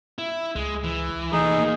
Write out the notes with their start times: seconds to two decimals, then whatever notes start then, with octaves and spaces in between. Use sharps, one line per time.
0.19 E4
0.56 C#2 G#3
0.84 E3
1.32 A#2 E3 A3 D#4 G#4
1.58 A#2 A#3